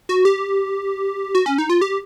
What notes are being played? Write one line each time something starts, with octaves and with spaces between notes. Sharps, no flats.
F#4
G4
F#4
C#4
D#4
F4
G4